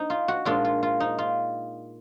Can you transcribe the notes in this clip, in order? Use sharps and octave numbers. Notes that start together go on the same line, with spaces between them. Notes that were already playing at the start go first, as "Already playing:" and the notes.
Already playing: D#4
F4
F#4
A#2 G#3 D4 F4
F4
F4
D#4
F4